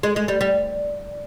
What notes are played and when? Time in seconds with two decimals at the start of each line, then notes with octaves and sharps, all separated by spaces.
0.03 G#3
0.16 G#3
0.28 G3
0.41 G3